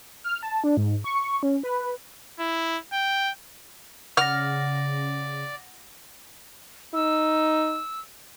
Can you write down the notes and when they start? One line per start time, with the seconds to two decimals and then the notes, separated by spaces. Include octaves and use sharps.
0.24 F6
0.43 A5
0.64 D4
0.77 G#2
1.04 C#6
1.43 C#4
1.63 B4
2.39 E4
2.93 G5
4.17 C#3 D5 F#5 F6 A#6
6.94 D#4 E6